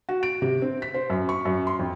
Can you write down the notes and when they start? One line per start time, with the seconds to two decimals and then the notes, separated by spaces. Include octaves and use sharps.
0.09 F#4
0.23 D7
0.42 C3
0.62 C4
0.82 B6
0.94 C5
1.10 F#2
1.29 C#6
1.45 F#2
1.67 C6
1.79 F2